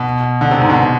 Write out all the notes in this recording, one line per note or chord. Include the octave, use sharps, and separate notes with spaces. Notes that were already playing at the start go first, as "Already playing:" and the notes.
Already playing: B2
D3
C3
G#2
B2